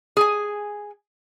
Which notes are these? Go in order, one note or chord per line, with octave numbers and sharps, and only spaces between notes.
G#4 G#5